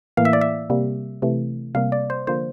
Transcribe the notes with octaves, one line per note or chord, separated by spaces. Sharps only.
A2 E3 A#3 F5
E5
D5
E5
C3 G3 A#3
C3 E3 A3
C3 G3 A#3 F5
D5
C5
D3 F3 A#3 C5